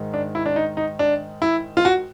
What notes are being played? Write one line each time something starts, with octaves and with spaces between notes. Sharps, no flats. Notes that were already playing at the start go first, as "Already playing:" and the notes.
Already playing: G#2 D#3 G#3
D4
E4
D4
D#4
D#4
D4
E4
F4
F#4